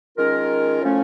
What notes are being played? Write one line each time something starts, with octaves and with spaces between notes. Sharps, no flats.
D#3 G#3 C#4 F4 A#4
A2 F3 A3 C#4 F4